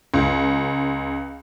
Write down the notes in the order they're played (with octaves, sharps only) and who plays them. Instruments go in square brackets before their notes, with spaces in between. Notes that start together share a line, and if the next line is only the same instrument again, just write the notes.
[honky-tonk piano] C#2